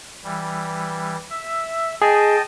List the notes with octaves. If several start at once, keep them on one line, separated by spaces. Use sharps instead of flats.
E3 G3
E5
G#4 D#5 G5 A5